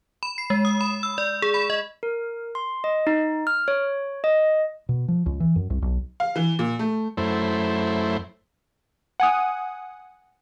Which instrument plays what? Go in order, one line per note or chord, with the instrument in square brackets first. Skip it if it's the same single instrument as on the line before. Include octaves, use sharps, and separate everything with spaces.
[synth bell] B5
C7
G#3
D#6
B5
E6
D5
G#4
B5
D#5
[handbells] A#4
C6
D#5
D#4
F6
C#5
D#5
[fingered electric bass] B2
F3
C#2
E3
F#2
C2
B1
[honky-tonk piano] F5
E3
A#2
A3
[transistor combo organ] F#2 A3 E4 C5
[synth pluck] F#5 G#5 D#6